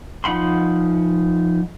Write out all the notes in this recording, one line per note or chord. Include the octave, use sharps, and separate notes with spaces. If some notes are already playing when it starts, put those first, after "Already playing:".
F3 D#4 F#5 B5 C6